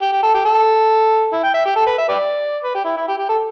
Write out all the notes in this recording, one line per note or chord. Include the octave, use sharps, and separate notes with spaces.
G4
G4
A4
G4
A4
E4
G5
E5
G4
A4
B4
E5
G4 B4 D5
B4
G4
E4
E4
G4
G4
A4